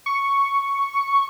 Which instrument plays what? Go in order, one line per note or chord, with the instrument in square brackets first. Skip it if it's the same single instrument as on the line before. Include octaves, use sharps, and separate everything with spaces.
[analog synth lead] C#6